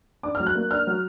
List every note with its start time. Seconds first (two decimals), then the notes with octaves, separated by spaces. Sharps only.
0.23 D4 D6
0.35 F6
0.40 F#3
0.47 F#6
0.55 A#3
0.71 D4 F6
0.87 F#3